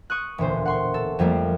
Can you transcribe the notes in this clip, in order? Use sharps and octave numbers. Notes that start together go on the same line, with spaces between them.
C#6 D#6 F#6
E1 D2 A#2 C5
F#5 C6 C#6
A4
F2 F3 G3 A3 A#3